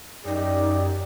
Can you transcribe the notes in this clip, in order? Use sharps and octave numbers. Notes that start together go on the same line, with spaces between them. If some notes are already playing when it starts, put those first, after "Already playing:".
F#2 D#4 G4 D5